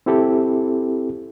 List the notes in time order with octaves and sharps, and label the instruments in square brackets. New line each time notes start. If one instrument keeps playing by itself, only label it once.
[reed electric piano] C4 E4 G4 A4